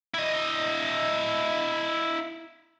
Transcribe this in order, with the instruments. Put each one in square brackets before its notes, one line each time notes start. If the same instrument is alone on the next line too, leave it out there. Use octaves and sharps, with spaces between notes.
[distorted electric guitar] E4 D#5